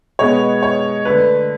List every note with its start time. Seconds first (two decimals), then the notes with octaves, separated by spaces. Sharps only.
0.19 B2 G#3 B3 C#5
0.63 C#5
1.05 D3 A3 B4